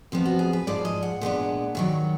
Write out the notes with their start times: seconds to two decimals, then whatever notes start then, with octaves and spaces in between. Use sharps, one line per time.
0.12 F2 F3 B3 F4
0.26 F#4
0.39 G#4
0.53 B4
0.67 G#2 F3 G#3 D5
0.85 D#5
1.03 F#5
1.21 A#2 G#3 B3 D4
1.75 D#2 D#3 F#3